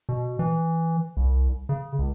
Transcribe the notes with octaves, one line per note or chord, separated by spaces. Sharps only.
B2
E3
C2
C#3
C#2